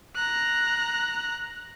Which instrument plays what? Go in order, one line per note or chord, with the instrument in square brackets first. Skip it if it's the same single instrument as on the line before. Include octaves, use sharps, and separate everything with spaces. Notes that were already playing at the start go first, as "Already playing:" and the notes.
[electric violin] A#5 F#6